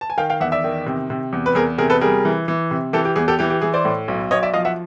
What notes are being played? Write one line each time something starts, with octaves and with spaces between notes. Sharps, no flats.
A5
G#5
D#3 F5 G5
F5 G5
E2 E5 F#5
D5 E5
D#3
C3
C3
E2
B4
E2 G#4 A#4
C3 G#4 A#4
A4 B4
G3 G#4 A#4
E3
E3
C3
E3 G4 A4
G4
E2 G#4
G4 A4
E3 G4
G4
E3 G#4
C5 D5
A2
B1
B1 C#5 D#5
D5 E5
F3 D#5 F5
E5 F#5